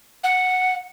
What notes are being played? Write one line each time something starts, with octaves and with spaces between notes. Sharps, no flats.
F#5